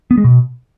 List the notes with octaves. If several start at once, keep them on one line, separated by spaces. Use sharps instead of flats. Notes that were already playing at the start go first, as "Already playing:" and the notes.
B3
G#3
B2